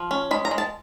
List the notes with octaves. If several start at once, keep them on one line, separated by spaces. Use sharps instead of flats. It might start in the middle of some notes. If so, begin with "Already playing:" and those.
Already playing: F3
C#4
G#3 B5
A#5
G#3
A5